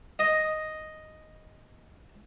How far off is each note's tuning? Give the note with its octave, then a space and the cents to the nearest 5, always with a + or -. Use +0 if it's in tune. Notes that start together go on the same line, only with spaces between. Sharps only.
D#5 +0